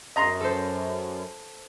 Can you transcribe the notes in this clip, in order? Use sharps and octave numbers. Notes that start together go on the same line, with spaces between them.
F#2 D#5 A#5 C6
A4 C5